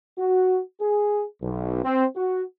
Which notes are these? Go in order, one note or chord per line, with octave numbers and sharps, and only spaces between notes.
F#4
G#4
B1
C4
F#4